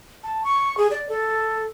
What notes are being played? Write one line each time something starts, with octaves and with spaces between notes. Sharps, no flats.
A5
C#6
G#4
D5
A4